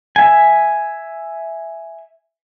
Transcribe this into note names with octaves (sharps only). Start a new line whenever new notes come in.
E5 G#5